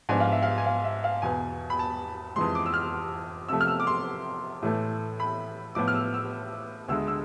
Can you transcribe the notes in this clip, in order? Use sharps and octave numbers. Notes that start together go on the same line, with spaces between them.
G#2 F3 B3 D4 G#5
F5
E5
F5
G#5
F5
E5
F5
E2 B2 B3 G#5
B5
A5
F2 E3 G#3 C6
D6
E6
F6
C3 F3 A3 E6
F6
E6
D6
C6
A2 E3 A3
B5
A2 F3 B3 D6
F6
E6
E6
D2 D3 G#3 E6
E6